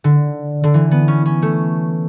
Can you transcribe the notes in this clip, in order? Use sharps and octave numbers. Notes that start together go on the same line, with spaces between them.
D3
D3
E3
B3
C#4
C#4
A3